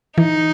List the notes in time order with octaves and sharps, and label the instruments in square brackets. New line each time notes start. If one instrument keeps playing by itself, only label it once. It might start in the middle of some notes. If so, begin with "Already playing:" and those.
[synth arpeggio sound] E3 [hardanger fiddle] D#4